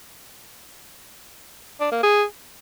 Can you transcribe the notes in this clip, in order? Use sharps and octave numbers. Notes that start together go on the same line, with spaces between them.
D4
A#3
G#4